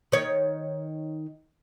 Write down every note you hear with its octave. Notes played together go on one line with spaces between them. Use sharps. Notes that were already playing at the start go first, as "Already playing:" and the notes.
D#3 C#5